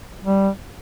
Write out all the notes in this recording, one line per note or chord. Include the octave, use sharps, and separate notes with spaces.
G3